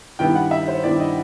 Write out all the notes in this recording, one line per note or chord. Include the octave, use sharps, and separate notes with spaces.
G2 D#3 G3 B3 E4 G5
F#5
E5
C5
G2 D#3 G3 B3 E4 D5
D#5